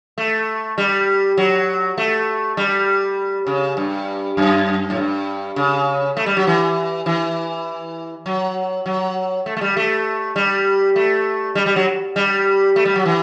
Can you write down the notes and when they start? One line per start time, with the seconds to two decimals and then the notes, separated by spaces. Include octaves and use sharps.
0.18 A3
0.78 G3
1.37 F#3
1.97 A3
2.57 G3
3.47 C#3
3.77 G2
4.37 F#2
4.90 A2
4.97 G2
5.56 C#3
6.17 A3
6.26 G3
6.37 F#3
6.47 E3
7.06 E3
8.26 F#3
8.86 F#3
9.46 A3
9.57 A3
9.61 G3
9.77 A3
10.36 G3
10.96 A3
11.55 G3
11.66 G3
11.76 F#3
12.16 G3
12.76 A3
12.85 G3
12.96 F#3
13.05 E3